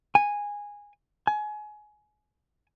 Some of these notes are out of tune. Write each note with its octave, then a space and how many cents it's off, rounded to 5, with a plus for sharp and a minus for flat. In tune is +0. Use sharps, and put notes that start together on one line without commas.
G#5 -10
G#5 +25